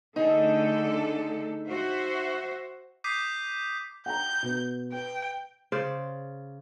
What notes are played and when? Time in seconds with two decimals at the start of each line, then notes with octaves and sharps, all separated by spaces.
0.16 D3 A3 D#4 G#4 A4
1.66 F#4 C5 E5
3.04 D6 D#6 G6 B6 C7 D#7
4.06 F#5 G5 A#5 G6
4.43 B2 B3
4.93 B4 G5
5.72 C#3 C5 D5